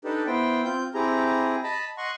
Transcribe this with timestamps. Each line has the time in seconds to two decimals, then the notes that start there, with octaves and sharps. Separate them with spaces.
0.05 D4 D#4 G4 A4 B4
0.27 B3 E4 C5 G5
0.65 C4 F4 G6
0.94 C4 E4 G4 G#4 A#5
1.64 D#5 A5 B5
1.98 D#5 F#5 C6 C#6